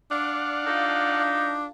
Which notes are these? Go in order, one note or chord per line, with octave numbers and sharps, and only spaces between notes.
D4 D5 F5 F#5
D#4 F4 A4